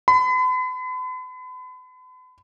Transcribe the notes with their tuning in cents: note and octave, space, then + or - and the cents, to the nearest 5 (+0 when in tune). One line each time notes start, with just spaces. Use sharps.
B5 +40